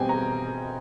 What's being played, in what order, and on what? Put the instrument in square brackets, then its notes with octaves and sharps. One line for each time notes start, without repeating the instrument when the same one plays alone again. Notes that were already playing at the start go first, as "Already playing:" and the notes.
Already playing: [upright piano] B2 G3 C4 G5 G#5
A#5